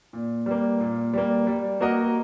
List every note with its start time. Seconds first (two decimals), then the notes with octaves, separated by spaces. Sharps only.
0.13 A#2
0.46 G3 A#3
0.81 A#2
1.13 G3 A#3
1.47 G3
1.81 A#3 F#4 A#4 D#5